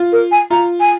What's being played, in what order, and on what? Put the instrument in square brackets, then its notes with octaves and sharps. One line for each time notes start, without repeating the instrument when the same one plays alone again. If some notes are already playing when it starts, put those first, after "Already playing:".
Already playing: [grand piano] F4
[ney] A#4
G#5
[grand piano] F4 [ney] A#5
[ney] G#5